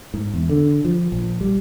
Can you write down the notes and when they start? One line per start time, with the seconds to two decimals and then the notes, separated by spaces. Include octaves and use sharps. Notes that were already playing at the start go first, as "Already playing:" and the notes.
0.14 G#2
0.34 E2
0.49 D3
0.85 F3
1.12 A#1
1.41 G3